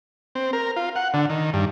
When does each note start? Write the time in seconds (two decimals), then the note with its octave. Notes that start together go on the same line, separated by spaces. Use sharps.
0.35 C4
0.53 A#4
0.76 F4
0.96 F#5
1.14 D3
1.30 D#3
1.54 G2